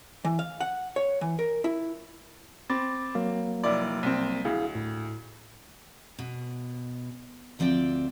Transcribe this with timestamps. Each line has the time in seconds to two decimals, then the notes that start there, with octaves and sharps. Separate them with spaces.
0.25 E3
0.39 F5
0.61 F#5
0.96 C#5
1.21 E3
1.39 A#4
1.64 E4
2.70 C4 B5 D6 A6
3.15 F#3 A#3
3.64 F1 E4 D5
4.03 C2 C4
4.45 D2 E4 G#4 F5
4.75 A2
6.19 B2
7.59 D2 F3 C4 D5 G5